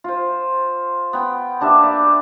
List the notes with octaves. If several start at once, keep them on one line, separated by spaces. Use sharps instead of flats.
F4 C5
B3 G5
A#3 D4 G4 E5
B4 D5 E5